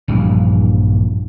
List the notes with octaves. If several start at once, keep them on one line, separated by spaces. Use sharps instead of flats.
A#1 G2 E3 F3